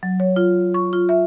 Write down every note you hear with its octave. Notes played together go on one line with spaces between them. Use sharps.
F#3
C#5
F4
C#6
F4
E5